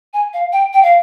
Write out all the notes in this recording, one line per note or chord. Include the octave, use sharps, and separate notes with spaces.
G#5
F5
G5
G5
F5